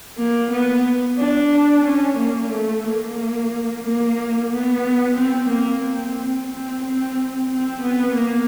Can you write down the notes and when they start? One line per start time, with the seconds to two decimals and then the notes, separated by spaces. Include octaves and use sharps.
0.18 A#3
0.51 B3
1.18 D4
1.85 C#4
2.18 A#3
2.51 A3
2.84 A#3
3.84 A#3
4.50 B3
5.16 C4
5.50 A#3
5.84 C4
6.50 C4
6.83 C4
7.50 C4
7.82 B3
8.16 A#3